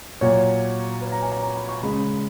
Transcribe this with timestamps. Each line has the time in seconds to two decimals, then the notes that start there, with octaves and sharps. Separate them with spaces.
0.21 A#2 F#3 C#5
1.02 B4
1.12 A#5
1.22 G#5
1.31 A#5
1.42 A#5
1.56 B5
1.69 C#6
1.82 C#3 G#3 B5